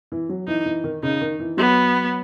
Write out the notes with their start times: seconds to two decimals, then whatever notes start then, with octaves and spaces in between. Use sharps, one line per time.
0.12 E3
0.29 F#3
0.47 E3 D#4
0.66 E3
0.84 D#3
1.03 C#3 D#4
1.21 D#3
1.40 E3
1.57 F#3 B3